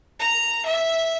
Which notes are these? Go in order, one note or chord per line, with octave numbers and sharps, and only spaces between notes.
A#5
E5